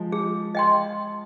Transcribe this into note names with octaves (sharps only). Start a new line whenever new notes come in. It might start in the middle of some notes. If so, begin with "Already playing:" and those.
Already playing: F3 G#3
G#4
D#5 G5 C6